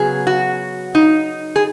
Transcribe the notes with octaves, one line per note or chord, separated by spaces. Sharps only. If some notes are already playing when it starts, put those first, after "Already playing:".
Already playing: C#3 F#3 B3 G#4
F#4
D#4
G#4